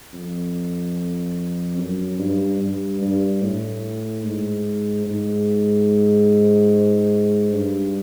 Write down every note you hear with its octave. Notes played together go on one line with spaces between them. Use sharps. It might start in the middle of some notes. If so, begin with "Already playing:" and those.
F2
F#2
G2
G2
G2
A2
G#2
G#2
G2